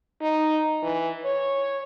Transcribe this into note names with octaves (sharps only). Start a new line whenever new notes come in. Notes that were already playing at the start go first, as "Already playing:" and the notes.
D#4
E3
C#5